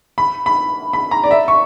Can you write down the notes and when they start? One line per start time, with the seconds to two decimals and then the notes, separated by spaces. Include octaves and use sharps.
0.18 B5
0.46 B5
0.93 B5
1.11 A#5
1.24 D5
1.31 E5
1.48 C#6